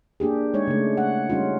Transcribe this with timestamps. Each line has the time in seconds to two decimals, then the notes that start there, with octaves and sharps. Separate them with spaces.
0.20 A#3 D4 G4 G#4
0.54 G#3 D#4 C#5
0.67 C#3 A3
0.97 F#5
1.30 G3 C#4 D#4 F4